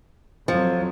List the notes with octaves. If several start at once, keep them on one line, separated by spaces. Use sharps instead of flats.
F2 F3 F#3